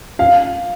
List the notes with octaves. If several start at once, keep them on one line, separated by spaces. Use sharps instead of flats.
F5